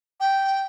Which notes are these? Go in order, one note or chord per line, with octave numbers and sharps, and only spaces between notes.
G5